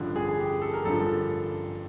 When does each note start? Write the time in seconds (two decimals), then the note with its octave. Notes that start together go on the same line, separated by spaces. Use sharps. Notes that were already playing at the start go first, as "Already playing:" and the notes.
Already playing: A1 G2 D3 F3
0.16 G#4
0.28 G#4
0.38 G4
0.62 A4
0.74 A#4
0.84 A1 G2 D3 F3 A4